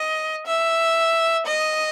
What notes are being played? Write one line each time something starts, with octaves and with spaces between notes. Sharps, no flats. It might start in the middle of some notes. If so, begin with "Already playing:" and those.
Already playing: D#5
E5
D#5